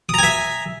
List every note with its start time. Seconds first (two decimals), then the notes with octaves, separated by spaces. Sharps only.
0.09 D#6
0.14 A#5
0.18 G#5
0.23 E5